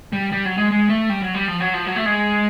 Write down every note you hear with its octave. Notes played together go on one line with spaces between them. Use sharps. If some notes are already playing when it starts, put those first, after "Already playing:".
G3
G3
F#3
G#3
G#3
A3
G3
F#3
G3
F3
F#3
F3
F#3
A3
G#3